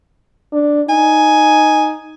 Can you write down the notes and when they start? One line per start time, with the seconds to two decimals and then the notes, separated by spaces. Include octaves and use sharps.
0.52 D4
0.89 D#4 G#5